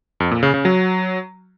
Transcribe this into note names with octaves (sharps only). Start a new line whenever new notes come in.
F2
A#2
C#3
C#3
F#3